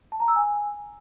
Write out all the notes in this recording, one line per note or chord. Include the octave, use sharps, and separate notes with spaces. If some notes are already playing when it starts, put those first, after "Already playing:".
A5
A#5
E6
G#5